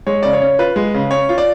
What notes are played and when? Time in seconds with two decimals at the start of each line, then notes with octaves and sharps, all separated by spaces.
0.07 G#3 C#5
0.23 C#3 D5
0.33 C#5
0.42 C#4
0.59 F4 B4
0.76 G#3
0.94 C#3
1.11 C#4 C#5
1.29 F4
1.38 D5